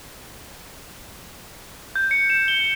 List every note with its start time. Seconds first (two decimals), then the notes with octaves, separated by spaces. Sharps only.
1.96 G6
2.11 C#7
2.30 E7
2.48 G7